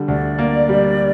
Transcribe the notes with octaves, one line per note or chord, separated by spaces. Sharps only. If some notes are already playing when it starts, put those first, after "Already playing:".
Already playing: D3 G3
D2 D5
A#3
G3